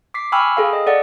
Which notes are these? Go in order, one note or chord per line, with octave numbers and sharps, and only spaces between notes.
D6 B6 C7
G5 G#5 B5 C#6 E6 F6
G#4 A4 F5
D#5
A4 D5 F#5